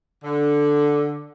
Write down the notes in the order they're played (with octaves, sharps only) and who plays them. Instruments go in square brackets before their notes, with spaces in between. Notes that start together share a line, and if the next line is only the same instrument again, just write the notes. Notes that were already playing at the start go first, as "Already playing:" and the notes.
[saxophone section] D3